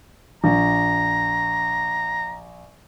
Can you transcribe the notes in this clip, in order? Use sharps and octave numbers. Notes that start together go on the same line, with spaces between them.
A#1 A#5